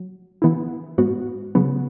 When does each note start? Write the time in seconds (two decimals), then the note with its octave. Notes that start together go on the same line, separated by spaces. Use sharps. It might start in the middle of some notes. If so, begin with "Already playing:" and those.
Already playing: F#3
0.42 E3 B3 E4
0.98 G#2 G#3 B3 F#4
1.55 C#3 F#3 B3